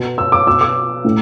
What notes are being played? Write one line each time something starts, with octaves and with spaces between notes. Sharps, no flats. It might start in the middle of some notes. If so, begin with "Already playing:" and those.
Already playing: B2
E6
D6
B2 E6
D6
A2